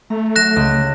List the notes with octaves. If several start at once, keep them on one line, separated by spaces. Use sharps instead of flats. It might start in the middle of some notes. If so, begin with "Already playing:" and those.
A3 A#5
F#3 F#6 A#6 E7
C#2